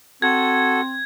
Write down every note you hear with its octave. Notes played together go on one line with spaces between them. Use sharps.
C4 F#4 A4 G#6